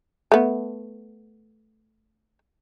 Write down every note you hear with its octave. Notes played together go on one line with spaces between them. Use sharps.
A3 B3